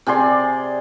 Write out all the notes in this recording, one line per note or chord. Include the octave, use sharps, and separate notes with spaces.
C3 G#4 D5 C6